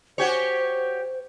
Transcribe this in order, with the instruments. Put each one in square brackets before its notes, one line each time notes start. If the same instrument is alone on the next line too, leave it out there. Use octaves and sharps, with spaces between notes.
[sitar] F#4 G4 C#5 [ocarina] C5